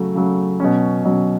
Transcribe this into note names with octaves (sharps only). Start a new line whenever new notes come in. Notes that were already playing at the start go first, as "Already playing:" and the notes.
Already playing: C#3 F#3 A3
C#3 F#3 A3
B2 F#3 C#4
B2 F#3 C#4